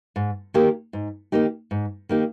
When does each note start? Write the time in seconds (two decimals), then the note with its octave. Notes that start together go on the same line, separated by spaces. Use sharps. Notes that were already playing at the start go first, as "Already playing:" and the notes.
0.16 G#2
0.54 D#3 A#3 D#4 G4
0.93 G#2
1.32 D#3 A#3 D#4 G4
1.71 G#2
2.09 D#3 A#3 D#4 G4